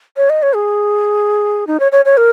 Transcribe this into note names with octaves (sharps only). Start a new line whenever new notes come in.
C#5
D#5
C#5
G#4
D#4
C#5
C#5
C#5
A#4